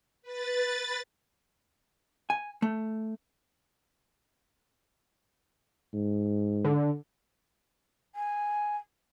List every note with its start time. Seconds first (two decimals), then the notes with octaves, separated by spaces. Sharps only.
0.22 B4 A6
2.30 G#5
2.62 A3
5.94 G#2
6.64 D3
8.15 G#5